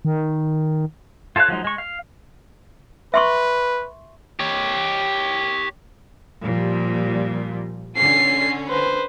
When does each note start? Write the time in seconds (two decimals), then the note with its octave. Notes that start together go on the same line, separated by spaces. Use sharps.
0.05 D#3
1.36 F4 A4 C#5 F5 F#6
1.48 F3 F#3 G#3 D#4
1.64 G#3 C#6
1.78 F5
3.14 B4 E5 C6 C#6
4.40 G4 C#5
6.43 A#2 F3 G3
7.97 D3 C#4 C7
8.68 B4 C5